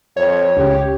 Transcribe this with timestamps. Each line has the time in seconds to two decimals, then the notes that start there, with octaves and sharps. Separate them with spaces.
0.17 F2 C#5
0.57 C#2 G4